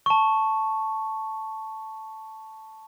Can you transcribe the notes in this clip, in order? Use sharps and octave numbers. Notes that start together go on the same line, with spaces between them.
A5 C#6